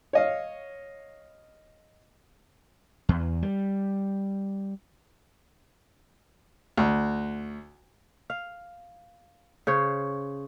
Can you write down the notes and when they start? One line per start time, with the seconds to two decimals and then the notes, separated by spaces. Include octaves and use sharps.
0.13 C#5 D#5 F5
3.09 E2
3.42 G3
6.77 D2
8.30 F5
9.67 C#3 C5 C#5